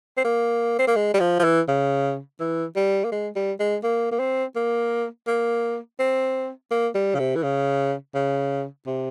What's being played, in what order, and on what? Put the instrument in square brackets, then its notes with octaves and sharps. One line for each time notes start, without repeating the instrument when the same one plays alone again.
[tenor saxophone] C4
A#3
C4
A#3
G#3
G3
F3
F3
E3
C#3
E3
G3
A#3
G#3
G3
G#3
A#3
A#3
C4
A#3
A#3
C4
A#3
G3
C#3
C3
E3
C#3
C#3
C3